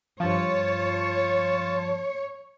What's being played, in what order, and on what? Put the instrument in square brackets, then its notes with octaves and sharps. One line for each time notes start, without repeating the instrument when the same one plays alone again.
[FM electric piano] G2 F3 [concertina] F4 A5 [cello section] C#5